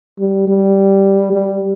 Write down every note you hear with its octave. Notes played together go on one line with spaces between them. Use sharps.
G3
G3
G3